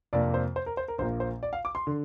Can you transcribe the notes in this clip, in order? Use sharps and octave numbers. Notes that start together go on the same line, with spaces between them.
F2 C3 A#3 D4 D5
C5
C5
A#4
C5
A#4
A#1 A#2 A#3 C5
C5
D5
F5
D6
C6
D3